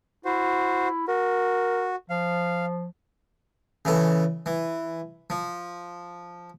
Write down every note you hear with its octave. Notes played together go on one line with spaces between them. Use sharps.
E4 F#4 C5
F#4 A#4
F3 F5
C#3 E3 A4
E3
F3